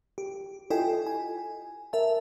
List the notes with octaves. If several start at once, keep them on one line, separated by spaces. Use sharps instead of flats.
G4
E4 F4 A4 D#5 G5 G#5
G#5
A#4 E5 A5